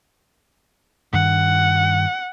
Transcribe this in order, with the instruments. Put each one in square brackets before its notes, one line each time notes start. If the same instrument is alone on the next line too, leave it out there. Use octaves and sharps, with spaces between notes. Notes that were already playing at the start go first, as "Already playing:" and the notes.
[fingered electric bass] G2 D#3 [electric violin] F#5